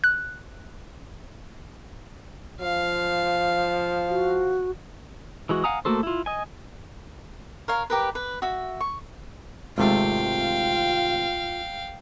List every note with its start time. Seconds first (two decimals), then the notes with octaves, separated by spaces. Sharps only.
0.04 F#6
2.62 F3 F5
4.09 F#4
5.49 E3 G#3 F#4
5.64 F5 F#5 G#5 A#5 D#6
5.85 A3 A#3 F#4 A4 C5
6.03 E4 F4
6.26 D#5 G#5
7.68 A#4 C#5 F5
7.90 G4 A#4 B4
8.15 B4
8.42 F#4 E5
8.80 C#6
9.78 G#1 C3 G#3 A3 F4 F5 G5